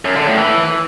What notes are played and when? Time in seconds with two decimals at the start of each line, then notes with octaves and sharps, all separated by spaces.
0.05 F#2
0.16 D3
0.27 A2
0.38 E3